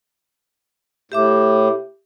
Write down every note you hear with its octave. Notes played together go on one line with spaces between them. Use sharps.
A2 G4 E5 D6